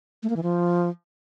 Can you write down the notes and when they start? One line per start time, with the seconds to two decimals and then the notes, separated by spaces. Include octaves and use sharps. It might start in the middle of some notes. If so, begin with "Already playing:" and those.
0.23 A3
0.30 A#3
0.36 E3
0.43 F3